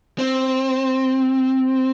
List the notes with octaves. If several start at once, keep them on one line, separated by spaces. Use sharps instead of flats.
C4